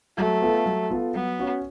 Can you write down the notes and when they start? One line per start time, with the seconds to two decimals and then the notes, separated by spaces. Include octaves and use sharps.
0.17 F#3 A3
0.42 B3 F4 A4
0.66 F#3
0.90 B3 F4 A4
1.15 F#3 B3
1.39 C#4 F#4 C#5